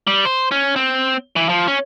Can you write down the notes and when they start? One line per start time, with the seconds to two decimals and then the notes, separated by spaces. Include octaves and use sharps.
0.07 G3
0.25 C5
0.51 C#4
0.76 C4
1.36 E3
1.49 F3
1.67 C#4